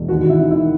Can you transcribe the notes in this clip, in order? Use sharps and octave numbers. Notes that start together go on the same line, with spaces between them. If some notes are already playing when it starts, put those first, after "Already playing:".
Already playing: E1
D#2 F#4
D#2
E4
D#3
E4